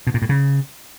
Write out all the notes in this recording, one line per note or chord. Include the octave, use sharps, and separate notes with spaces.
B2
A#2
A2
C#3